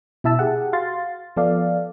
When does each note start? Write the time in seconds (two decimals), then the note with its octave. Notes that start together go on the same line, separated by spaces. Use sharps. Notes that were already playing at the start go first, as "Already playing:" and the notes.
0.24 B2 E4 E5 A5 E6
0.39 G4 G#4 F#5
0.73 F#4 F5 C6 A6
1.37 F3 B3 A4 D5 F5